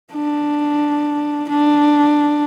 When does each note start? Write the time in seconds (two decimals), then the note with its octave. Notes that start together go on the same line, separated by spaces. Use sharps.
0.13 D4
1.49 D4